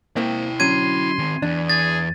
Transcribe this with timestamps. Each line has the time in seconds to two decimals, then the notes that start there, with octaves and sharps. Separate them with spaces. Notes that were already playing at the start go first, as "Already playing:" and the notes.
0.17 A#3 C4 E4 G5
0.60 D3 F#3 C#4 C6 G#6 D#7
1.18 D#3 C4
1.42 E2 D4
1.69 G#4 A6